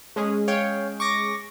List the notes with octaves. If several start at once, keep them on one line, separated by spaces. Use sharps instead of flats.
G#3 C#4 G#4
C#5 F5 G5
C#6 D6 A#6